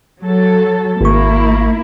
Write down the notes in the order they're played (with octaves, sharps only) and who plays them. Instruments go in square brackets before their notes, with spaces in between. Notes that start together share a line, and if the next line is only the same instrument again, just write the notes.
[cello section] F#3 A4
[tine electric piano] G#1 C#6 [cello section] A#3 E4